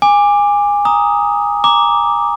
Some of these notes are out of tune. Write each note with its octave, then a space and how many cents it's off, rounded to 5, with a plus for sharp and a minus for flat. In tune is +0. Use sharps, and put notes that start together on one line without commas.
G#5 -20 D6 +10
A#5 +0 D#6 +10
A#5 +0 D6 +0